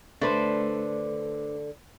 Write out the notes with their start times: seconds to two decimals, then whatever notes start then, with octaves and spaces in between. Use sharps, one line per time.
0.21 D3 A3 D4 B4 C5